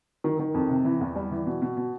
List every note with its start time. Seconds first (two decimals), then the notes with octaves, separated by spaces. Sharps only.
0.24 D#3
0.39 D#3
0.54 F2
0.70 C3
0.85 E3
1.01 E2
1.16 G3
1.31 E3
1.46 B2
1.62 B2
1.77 B2